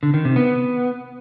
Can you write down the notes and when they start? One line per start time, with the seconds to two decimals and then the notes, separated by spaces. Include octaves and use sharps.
0.03 D3
0.14 D#3
0.25 C3
0.36 B3